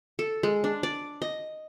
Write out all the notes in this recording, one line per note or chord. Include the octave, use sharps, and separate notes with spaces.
A4
G#3
D4
D5
D#5